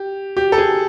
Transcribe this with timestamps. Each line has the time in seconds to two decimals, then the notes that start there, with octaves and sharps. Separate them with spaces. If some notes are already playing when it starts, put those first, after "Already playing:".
Already playing: G4
0.37 G4
0.52 A4
0.58 G#4